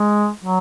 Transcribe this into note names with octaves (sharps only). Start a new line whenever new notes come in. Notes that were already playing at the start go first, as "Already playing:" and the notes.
Already playing: G#3
F#3